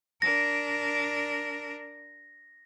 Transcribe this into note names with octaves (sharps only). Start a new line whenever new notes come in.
D4 A#4 A#6